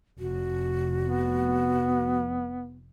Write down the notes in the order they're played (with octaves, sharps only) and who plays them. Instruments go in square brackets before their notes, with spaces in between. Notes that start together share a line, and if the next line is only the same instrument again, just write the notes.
[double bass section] F1 [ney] F#4
[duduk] B3